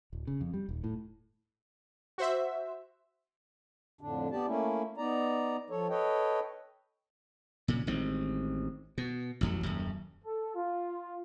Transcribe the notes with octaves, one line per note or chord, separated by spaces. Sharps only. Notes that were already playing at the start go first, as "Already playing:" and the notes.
D1
C#3
F2
G3
D#1
A2
F#4 C5 E5
F2 A2 D3 D4
B3 G4 D5 A5
A3 A#3 C#4 E4
B3 D#4 D5 A#5
F3 A4 C#5
A4 B4 C#5 D#5 G5
A#2 C#3
A1 D#3 G#3 C4
B2
A1 F2 F#3
D#1 F#2
A4
F4